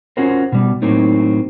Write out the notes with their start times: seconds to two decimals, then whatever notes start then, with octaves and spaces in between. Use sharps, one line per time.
0.17 C#4 F4 F#4 A#4 C5
0.52 B2 G3
0.82 A2 F#3 A#3 C4 D#4